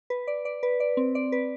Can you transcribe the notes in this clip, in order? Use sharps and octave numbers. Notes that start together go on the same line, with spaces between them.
B4
D5
D5
B4
D5
C4
D5
B4